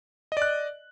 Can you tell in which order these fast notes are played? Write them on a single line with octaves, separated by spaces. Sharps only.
D#5 D5 F#6